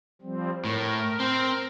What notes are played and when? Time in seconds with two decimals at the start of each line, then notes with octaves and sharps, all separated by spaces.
0.22 F3 G3 C4
0.65 A2 A#4
1.20 C4